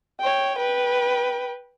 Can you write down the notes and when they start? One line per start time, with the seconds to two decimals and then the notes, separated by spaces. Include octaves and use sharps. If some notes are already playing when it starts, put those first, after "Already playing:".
0.20 C#5 G5
0.58 B4 G5